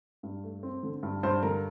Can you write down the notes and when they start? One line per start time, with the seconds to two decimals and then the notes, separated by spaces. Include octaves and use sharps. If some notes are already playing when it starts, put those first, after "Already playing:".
0.23 G2
0.43 A3
0.63 C4
0.83 D3
1.03 G2
1.23 G2 C5
1.43 D3 A#4